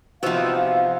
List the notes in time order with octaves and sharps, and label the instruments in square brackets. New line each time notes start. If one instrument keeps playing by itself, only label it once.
[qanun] C3 D#4 F4 [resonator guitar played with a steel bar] F3 B3 [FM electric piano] F#4 E6 [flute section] F5